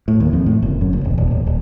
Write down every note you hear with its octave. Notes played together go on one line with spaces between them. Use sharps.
A2
D#2
F2
A2
F#1
F#2
F#1
E1
D#1
D1
D#1